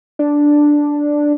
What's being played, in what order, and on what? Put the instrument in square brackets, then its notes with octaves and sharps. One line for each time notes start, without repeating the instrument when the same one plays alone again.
[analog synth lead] D4